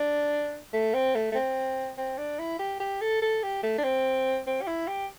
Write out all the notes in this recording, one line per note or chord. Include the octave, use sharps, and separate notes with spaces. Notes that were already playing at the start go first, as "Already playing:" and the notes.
Already playing: D4
A3
C4
A3
A3
C4
C4
D4
E4
G4
G4
A4
A4
G4
A3
D4
C4
C4
G4
E4
G4